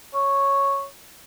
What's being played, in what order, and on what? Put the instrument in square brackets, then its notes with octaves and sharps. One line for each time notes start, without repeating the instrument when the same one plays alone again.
[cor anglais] C#5